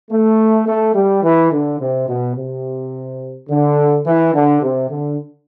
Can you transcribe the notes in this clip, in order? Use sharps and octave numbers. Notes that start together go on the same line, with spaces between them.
A3
A3
G3
E3
D3
C3
B2
C3
D3
E3
D3
C3
D3